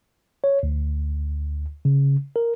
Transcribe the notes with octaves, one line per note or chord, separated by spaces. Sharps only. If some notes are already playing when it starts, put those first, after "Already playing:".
C#5
D2
C#3
A#4